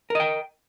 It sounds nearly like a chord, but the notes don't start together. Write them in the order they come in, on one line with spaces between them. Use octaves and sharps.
A#4 D#5 G5